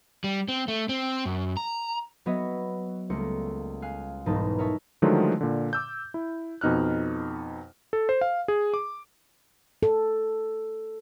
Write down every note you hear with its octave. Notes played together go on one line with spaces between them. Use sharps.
G3
C4
A3
C4
F#2
A#5
F#3 B3 F#4 C#5 D#5 E5
C#2 G3 A3 A#3 C#7
F5 G#5 F#6
E1 B1 G#2 G3 D#4 A5
A#4 C#5 D#5 E5 A5 C#6
D3 D#3 F3 F#3 G#3 A3
A#2 D3
D6 E6 G6
E4
F2 B2 D#4 F6 F#6
A4
C5
F5
G#4
D6
A4